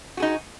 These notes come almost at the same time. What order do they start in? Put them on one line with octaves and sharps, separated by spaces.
F#4 G#4 D#4